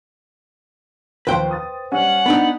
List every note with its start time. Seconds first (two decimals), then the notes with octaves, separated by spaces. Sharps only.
1.27 D#2 F3 B4 C5 G5 C6
1.51 D#6 A6
1.92 G3 C#4 F#5
2.26 B3 D4 D#4 B5